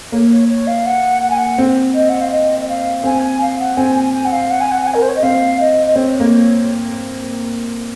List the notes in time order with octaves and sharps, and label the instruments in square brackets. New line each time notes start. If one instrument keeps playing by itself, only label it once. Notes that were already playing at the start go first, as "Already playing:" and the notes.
[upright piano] A#3 [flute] C#5
[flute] C#5
C#5
F5
F#5
F#5
G#5
F#5
[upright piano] C4
[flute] D#5
F#5
F5
D#5
D#5
F5
[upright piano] C4 [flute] G#5
[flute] G#5
F5
F#5
[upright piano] C4 [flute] G#5
[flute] G#5
G#5
F#5
F5
F#5
G#5
F#5
F#5
G#5
A#4
C5
C#5
D#5
[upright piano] C4 [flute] F5
[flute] D#5
D#5
[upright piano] C4 [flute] C#5
[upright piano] A#3